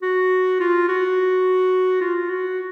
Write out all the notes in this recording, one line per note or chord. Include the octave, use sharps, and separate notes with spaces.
F#4
F4
F#4
F4
F#4